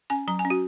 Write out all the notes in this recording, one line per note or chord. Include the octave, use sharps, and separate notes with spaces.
C#4 G#5
F#3 A#5
G#5
C#4
F#4